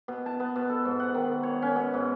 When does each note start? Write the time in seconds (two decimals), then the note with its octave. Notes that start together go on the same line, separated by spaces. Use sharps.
0.08 B2
0.26 A5
0.40 B3
0.56 B2
0.69 A4
0.85 G#2
1.00 F#5
1.14 D#3
1.43 C#5
1.62 C#4
1.76 B2
1.94 G#2